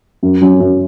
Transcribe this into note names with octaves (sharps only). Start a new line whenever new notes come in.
F#2
F#3 C#4
F#2